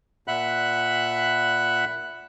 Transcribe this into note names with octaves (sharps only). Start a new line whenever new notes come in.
A#2 E5 F#5 B5 F#6